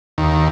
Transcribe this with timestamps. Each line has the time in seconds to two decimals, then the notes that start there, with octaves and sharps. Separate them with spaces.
0.18 D#2